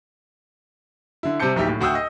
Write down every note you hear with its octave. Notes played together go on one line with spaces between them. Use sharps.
D3 E4
C3 G3 C4 A5 G6 C#7
D1 A#1 D#4 G4 E5
A2
D2 F#4 G5 D#6 E6 G6
D#5